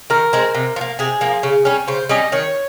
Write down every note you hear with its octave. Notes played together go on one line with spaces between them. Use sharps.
D#3 A#4
G#3 C4
C3
F3
A#3
C3 G#4
F3 A#3
C#3
G3 C#4
C#3 C5
G3 C#4 D#5
D#3 C#5